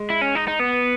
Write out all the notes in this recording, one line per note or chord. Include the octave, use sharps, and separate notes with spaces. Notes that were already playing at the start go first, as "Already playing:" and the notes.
Already playing: G#3
E4
C#4
D#4
D#4
B3